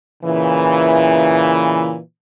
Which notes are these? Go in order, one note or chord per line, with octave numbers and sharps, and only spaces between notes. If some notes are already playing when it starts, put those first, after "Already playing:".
A#2 C#3 E3